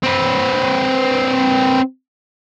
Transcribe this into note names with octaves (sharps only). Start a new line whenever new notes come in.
C4 B4